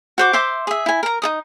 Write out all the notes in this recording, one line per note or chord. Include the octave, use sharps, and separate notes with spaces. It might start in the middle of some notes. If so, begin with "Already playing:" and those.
F#4 C5 D6
C5 E5 C6 D6
G#4 E5
E4 G#5
A#4 A#5
D#4 A4 D#6